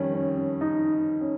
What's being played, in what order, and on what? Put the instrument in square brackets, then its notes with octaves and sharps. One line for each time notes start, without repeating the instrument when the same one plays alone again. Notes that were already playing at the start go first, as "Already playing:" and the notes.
Already playing: [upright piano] F2 D#3 G3 [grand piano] C#4
[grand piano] C#4
C#4
D#4
C#4